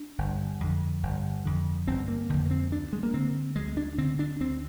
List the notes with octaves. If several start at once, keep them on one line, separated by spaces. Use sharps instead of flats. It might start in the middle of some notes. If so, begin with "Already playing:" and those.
Already playing: D4
G1
F2 D3
G1
F2 D3
G1 C4
A#3
F2 D3
A#3
C4
D2 D4
G#3
A#3
D3 C4
D2 G#3
D4
D3 C4
D4
D2 C4